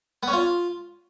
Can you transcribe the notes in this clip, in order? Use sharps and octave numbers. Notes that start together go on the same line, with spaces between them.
B3
C#4
F4